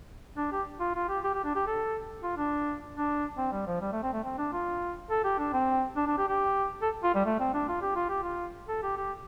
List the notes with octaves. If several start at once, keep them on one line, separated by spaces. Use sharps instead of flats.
D4
G4
F4
F4
G4
G4
G4
D4
G4
A4
F4
D4
D4
C4
G3
F3
G3
A3
C4
A3
C4
D4
F4
A4
G4
D4
C4
D4
D4
G4
G4
A4
F4
G3
A3
C4
D4
F4
G4
F4
G4
F4
A4
G4
G4